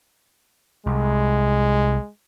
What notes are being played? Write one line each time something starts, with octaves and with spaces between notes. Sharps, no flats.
C2 G#3